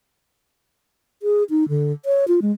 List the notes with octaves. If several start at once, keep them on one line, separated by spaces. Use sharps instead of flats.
G#4
D#4
D3
C#5
F4
G#3